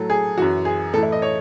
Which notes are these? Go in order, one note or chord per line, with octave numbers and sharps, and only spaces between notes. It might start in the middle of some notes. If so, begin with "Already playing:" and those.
Already playing: A2 F#3 A4
G#4
F#2 E3 F#4
G#4
A2 E3 A4
E4
D#5
C#5